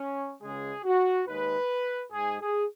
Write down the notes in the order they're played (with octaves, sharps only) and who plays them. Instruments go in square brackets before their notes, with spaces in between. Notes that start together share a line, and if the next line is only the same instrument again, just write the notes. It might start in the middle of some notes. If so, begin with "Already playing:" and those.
Already playing: [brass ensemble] C#4
C#2 C#3 G#3 G#4
F#4
D#2 D#3 G#3 B4
G#2 G#3 G#4
G#4